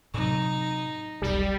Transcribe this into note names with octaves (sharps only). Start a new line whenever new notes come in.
A2 C3 F#3 D#4
E1 B1 G3